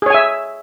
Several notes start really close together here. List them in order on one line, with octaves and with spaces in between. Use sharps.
G#4 C#5 G#5 E5